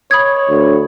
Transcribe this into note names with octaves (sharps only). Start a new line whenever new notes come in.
C#5 B5 D#6 G#6
D2